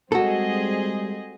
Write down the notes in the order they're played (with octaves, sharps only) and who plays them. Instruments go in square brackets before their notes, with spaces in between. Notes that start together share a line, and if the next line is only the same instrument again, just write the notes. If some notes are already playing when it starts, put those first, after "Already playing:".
[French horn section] G3 G#3 [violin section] C4 G#4 D#5 [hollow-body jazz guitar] F#4 A4